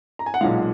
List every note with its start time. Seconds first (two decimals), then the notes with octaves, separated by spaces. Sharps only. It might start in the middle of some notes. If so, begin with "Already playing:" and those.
0.19 A#5
0.26 G#5
0.34 F#5
0.41 B1 A#2 G#3 F5